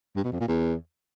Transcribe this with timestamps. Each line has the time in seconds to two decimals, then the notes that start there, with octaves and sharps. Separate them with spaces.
0.16 G2
0.24 B2
0.32 F2
0.40 A#2
0.48 E2